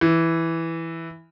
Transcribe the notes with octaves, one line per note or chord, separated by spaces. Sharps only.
E3